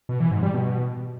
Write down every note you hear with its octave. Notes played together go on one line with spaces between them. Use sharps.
B2
E3
G#2
G3
B2